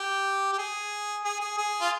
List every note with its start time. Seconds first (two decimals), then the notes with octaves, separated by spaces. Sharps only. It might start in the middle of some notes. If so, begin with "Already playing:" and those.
Already playing: G4
0.53 G4
0.58 G#4
1.24 G#4
1.40 G#4
1.57 G#4
1.81 F4